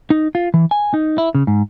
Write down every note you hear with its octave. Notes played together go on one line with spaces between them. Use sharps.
D#4
F4
E3
G#5
D#4
E4
C#3
G#2